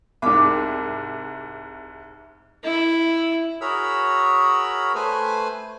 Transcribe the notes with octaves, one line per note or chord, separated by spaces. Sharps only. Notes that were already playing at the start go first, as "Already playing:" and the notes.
C2 G#2 D6 E6
E4
F#4 G#4 A#4 C#5 B5 E6
A3 B4 C5 G#5